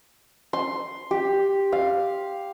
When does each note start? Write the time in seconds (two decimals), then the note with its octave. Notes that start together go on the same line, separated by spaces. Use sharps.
0.53 C6
1.11 G4
1.72 F5